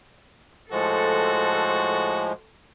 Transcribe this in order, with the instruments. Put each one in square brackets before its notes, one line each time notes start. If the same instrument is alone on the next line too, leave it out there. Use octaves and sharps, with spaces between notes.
[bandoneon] A2 F3 G#3 [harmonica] F#4 [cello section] A4 [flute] C5